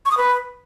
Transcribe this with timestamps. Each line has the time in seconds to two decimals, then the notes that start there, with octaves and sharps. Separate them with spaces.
0.06 C#6
0.11 D#6
0.17 B4